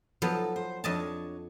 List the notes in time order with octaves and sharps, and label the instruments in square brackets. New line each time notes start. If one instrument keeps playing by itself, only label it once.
[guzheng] F3 F#3 B3 [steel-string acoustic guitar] A4 A5
[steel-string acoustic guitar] C5
[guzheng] F2 D#5 A5 [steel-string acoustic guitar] D4 C#5